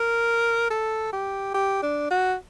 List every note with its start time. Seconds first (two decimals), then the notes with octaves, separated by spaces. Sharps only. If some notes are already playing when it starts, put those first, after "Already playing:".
Already playing: A#4
0.70 A4
1.12 G4
1.54 G4
1.82 D4
2.10 F#4